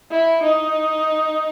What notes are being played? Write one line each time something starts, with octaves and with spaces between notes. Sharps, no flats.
E4
D#4